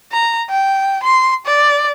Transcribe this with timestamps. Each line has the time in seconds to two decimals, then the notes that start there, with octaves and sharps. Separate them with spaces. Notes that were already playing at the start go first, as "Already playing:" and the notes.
0.11 A#5
0.50 G5
1.03 C6
1.46 D5